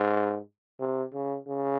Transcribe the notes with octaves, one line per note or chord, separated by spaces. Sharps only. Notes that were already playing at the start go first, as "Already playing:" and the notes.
Already playing: G#2
C3
C#3
C#3